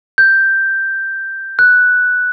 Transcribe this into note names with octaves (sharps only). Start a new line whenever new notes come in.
G6
F#6